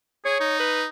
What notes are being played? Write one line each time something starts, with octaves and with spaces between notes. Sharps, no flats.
G#4 C#5
D#4
B4